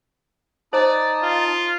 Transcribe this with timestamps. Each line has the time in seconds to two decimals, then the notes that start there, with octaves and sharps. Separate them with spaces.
0.73 D#4 C5 D5 A5 D#6
1.22 F4